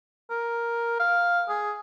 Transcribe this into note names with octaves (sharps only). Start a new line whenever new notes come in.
A#4
F5
G#4